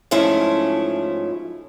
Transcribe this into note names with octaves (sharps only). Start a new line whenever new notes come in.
G#2 F3 F#3 A3 C#4 E4